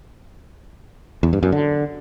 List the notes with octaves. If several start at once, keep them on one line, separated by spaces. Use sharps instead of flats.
E2
G2
F#2
D3